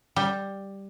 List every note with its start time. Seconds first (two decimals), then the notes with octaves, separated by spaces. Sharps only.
0.16 G3